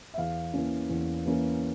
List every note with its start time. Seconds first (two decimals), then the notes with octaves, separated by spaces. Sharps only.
0.14 E5
0.18 E2 F5
0.54 E3 A#3 C#4
0.89 E2
1.26 E3 A#3 C#4